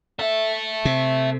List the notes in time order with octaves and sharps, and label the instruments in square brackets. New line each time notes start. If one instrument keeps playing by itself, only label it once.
[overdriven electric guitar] A4 E5
[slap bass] C3